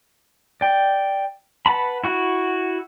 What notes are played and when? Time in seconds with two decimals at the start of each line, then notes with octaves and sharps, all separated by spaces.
0.61 D5 G5
1.66 B4 F#5 A5 B5
2.04 E4 F#4 F#5